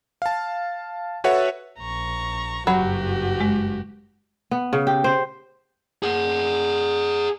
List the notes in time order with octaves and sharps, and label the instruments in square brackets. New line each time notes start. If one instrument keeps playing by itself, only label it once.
[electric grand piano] F5 A5
F#4 A4 B4 C#5 E5 F#5
[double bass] A#1 [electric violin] A#5 C#6
[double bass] F#1 G2 [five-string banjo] F#3 [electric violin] F#4 G4 [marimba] B5
[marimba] G#3
[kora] B3
C#3
G4
C5
[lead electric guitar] G#4 F#5